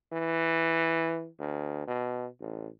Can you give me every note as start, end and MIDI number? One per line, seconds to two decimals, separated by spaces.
0.12 1.28 52
1.40 1.86 38
1.87 2.27 47
2.40 2.68 33